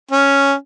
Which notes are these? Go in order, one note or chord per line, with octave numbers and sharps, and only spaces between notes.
C#4